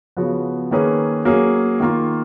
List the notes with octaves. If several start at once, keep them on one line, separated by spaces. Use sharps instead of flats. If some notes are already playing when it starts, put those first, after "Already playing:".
C#3 F3 B3 F#4
D#3 A#3 C#4 G#4 B4
F#3 A#3 C#4 G#4
D#3 A#3 F4